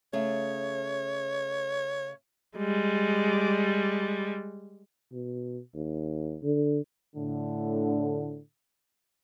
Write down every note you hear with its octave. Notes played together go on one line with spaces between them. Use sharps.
C#3 A3 C#5
G3 G#3
B2
D#2
D3
A2 D3